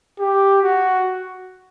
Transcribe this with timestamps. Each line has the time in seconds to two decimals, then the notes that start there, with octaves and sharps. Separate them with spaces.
0.19 G4
0.63 F#4